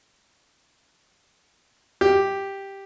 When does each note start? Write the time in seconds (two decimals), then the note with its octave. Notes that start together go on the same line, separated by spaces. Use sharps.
2.01 G4